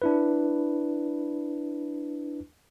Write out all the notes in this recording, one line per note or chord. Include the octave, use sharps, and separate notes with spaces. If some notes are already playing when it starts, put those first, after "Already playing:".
D4 E4 B4